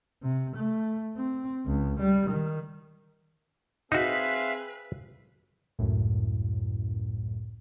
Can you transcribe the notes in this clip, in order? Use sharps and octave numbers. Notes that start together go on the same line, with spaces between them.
C3
A3
C4
C#2
G3
D#3
C4 D#4 F#4 G#4 B4 E5 F5
C#2 F#2 A2